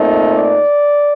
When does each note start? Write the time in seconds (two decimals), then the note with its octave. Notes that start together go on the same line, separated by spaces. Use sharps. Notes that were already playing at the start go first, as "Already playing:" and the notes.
Already playing: A#2 A3 C4 D#4
0.34 D5